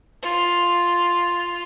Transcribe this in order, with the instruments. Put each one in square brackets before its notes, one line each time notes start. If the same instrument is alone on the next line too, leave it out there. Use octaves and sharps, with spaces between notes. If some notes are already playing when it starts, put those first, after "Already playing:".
[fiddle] F4